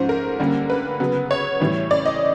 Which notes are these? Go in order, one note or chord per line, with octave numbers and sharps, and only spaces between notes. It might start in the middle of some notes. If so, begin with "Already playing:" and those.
Already playing: G#2 F3 A3 C#4 C5
A#4
D3 G3 A#3 C#4
B4
C#3 F#3 B3
C#5
A2 E3 G3
D5
D#5